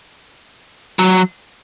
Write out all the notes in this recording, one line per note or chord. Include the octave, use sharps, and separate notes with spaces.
F#3